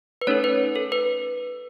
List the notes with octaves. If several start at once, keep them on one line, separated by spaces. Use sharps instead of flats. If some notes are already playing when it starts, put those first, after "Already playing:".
B4
A3 C#4 D#4 A4 C#5
B4
A4
B4